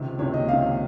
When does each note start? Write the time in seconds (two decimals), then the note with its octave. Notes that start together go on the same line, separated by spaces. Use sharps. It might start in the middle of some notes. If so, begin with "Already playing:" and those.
Already playing: C#2 C3 D#3
0.19 C#2 C3 D#3 C#5
0.34 D#5
0.48 C#2 C3 D#3 F5